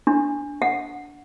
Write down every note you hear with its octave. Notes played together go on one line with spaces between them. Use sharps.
D4
F#5